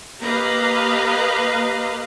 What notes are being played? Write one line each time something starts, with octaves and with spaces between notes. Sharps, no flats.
A#3 G4 B4 D#5 F5 A#5